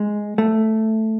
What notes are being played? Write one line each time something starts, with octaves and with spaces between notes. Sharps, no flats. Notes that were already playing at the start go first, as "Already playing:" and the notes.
Already playing: G#3
A3